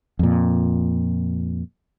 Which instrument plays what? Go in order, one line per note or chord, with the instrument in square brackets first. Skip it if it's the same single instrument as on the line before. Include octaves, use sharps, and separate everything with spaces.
[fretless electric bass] F2 A#2